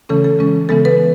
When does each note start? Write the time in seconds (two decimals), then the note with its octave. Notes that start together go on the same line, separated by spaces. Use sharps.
0.09 C#3 E3 A3 C#4 A4
0.24 A4
0.39 C#3 G#3 C#4
0.69 C#3 E3 G#3 B3 A4
0.85 B4